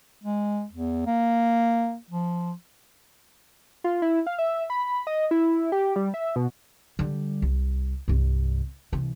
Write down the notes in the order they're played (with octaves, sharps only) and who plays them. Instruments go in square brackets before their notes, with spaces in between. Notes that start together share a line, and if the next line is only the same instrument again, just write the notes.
[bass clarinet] G#3
E2
A#3
F3
[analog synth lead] F4
E4
F5
E5
B5
D#5
E4
G4
G3
E5
B2
[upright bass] D3 G3
C2
C2 G2
C2 E3